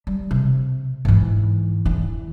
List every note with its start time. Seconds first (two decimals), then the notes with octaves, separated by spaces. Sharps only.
0.07 G3
0.31 C3
1.05 G#2 E3
1.85 E2 E3